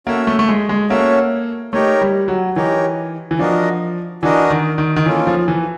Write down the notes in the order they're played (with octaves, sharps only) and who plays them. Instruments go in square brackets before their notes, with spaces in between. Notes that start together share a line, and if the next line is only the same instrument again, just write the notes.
[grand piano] A#3 [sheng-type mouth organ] C#4 F#4 A4 C#5 E5
[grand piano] A3
A3
G#3
G#3
[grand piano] A#3 [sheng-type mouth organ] C#4 F#4 A4 C#5 E5
[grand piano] A3 [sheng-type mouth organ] D#4 G4 A#4 C#5
[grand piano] G3
F#3
[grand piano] E3 [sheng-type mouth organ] D#4 G4 A#4 C#5
[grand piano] E3
[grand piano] F3 [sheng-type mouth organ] D4 F#4 A#4 D#5
[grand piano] E3 [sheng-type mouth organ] D4 F#4 A#4 D#5
[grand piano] D#3
D#3
D#3
[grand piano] E3 [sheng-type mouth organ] A#3 C#4 F4 A4
[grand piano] F3
E3